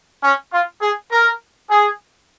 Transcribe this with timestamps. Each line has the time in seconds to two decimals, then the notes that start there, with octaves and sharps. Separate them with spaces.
0.23 C#4
0.52 F4
0.81 G#4
1.11 A#4
1.70 G#4